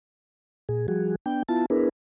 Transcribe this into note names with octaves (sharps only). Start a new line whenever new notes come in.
A#2 G#4
F3 G3 F#4 G#4
B3 D4 G5
B3 E4 F4 A5
B3 D4 E4 G#4 A#4 B4